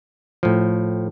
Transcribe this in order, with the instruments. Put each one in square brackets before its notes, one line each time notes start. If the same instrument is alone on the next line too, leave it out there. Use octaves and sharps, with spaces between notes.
[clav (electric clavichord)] A2 F3